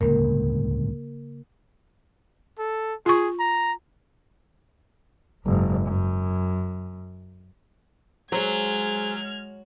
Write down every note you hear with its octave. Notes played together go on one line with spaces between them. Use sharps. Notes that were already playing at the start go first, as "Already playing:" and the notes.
D1 C#2 G2 C#3 A#3 A#4
A4
F4 G#4 C#6
A#5
F#1 G#2
F#2
F#3 G#3 G#4 C5 F6 G#6